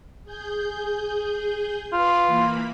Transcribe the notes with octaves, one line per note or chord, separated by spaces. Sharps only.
G#4 G6
F4 B4 C6 D6
E3 A#3 B5